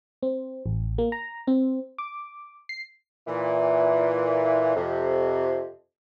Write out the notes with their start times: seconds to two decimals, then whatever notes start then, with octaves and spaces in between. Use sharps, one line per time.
0.23 C4
0.66 A1
0.98 A#3
1.12 A#5
1.47 C4
1.98 D6
2.69 C7
3.27 A#2 E3
4.76 F2 C3